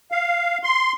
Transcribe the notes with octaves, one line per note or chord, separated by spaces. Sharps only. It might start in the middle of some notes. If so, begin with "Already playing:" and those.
F5
C6